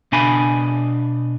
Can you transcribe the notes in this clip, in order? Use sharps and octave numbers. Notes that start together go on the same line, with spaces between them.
B2 D4 G#5 B5